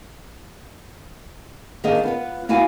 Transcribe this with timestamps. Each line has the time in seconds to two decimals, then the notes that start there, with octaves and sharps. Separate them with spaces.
1.84 D#3 A#3 D4 G#4 A4 D#5
2.03 B3 F4 B4
2.49 A#3 E4 F#4 F5 G#5